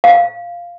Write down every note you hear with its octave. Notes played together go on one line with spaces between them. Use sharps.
F5